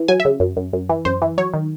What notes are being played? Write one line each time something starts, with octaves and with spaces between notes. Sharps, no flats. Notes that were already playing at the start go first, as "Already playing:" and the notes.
Already playing: E3
F#3 G#5
E5
C#3
F#2
F#2
F#2
E3
F#2 C5
E3
F#3 C#5
D#3